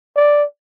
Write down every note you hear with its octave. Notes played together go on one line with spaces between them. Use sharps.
D5